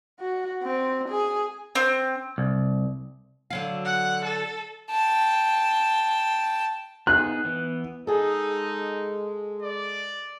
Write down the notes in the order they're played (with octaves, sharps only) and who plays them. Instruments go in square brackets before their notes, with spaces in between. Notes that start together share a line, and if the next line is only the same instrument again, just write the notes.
[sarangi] F#4
C4
G#4
[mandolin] C4
[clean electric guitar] C2
[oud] D3 F#3 F5
[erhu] F#5
A4
[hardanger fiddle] G5 A5
[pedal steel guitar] B3 D#4 G#4 [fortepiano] F#6
[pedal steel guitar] E3 B3
[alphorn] G#3 [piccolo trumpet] D#4 [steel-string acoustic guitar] G#4 A4
[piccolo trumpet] D5